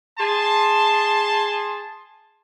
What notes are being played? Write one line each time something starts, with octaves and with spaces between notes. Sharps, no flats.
G#4 A5 C6